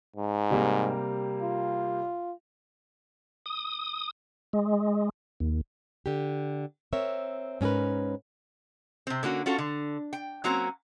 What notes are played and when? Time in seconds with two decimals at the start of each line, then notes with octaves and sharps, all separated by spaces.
0.16 G#2
0.51 C3 G3 A#3
1.42 F4
3.46 D#6
4.53 G#3
5.40 D#2
6.06 D3 G4
6.93 C4 A#4 C#5 E5
7.61 G#2 C#4 G#4 A#4 B4
9.07 C3 C4
9.23 D3 A#3 C#4 F#4
9.46 C#4 F4 F#4 A4
9.58 D3
10.13 G5
10.44 F#3 A#3 C4 C#4 F#4 A#5